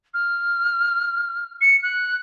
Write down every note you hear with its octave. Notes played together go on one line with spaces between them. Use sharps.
F6
C#7
F#6